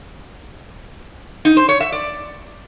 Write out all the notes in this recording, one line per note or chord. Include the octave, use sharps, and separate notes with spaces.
D#4
C5
C#5
E5
D5